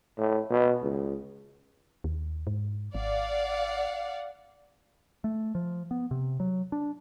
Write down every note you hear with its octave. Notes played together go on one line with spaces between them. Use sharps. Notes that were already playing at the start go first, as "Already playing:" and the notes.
A2
B2
C#2
D#2
G#2
G#1 D5 F5 F#5
A3
F3
B3
C3
F#3
D4